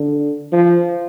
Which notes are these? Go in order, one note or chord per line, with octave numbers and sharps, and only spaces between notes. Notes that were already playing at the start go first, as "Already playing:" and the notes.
Already playing: D3
F3